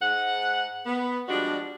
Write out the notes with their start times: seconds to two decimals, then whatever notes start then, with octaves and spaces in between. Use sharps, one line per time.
0.01 G#2 F#5
0.86 B3
1.28 F3 G3 G#3 D4 F#4